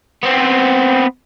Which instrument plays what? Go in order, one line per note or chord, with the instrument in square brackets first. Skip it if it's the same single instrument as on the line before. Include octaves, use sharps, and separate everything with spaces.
[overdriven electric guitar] B3 C4